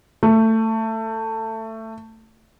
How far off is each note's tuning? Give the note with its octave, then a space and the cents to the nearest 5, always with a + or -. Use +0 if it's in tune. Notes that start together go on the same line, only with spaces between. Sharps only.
A3 +20